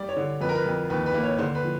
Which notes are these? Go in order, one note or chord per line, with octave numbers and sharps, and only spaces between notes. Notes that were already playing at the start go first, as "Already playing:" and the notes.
Already playing: G3 D5
C#5
D3
F2 B4
A#4
B4
F2
D#2 B4
B4
A#3
C#5
D3 C5
B4
F3